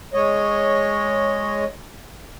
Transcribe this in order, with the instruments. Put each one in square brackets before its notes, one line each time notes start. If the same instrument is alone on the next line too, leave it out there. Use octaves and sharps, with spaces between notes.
[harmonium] G#3 C#5 D#5